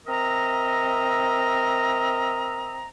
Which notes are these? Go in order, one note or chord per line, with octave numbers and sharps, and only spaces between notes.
C4 A#4 D#5 E5 A#5